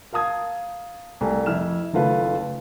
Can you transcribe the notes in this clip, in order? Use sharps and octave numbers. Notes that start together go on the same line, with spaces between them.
A#4 F5 A5 D#6 G#6
C2 A3 G#5
F2 E4 F6 E7
F#1 D#3 A3 F4 B4